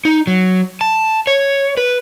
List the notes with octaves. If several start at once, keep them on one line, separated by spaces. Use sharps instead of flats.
D#4
F#3
A5
C#5
B4